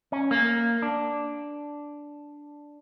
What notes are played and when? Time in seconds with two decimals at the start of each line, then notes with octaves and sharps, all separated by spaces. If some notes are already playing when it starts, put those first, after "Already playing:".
0.12 C#4
0.31 A#3
0.82 D4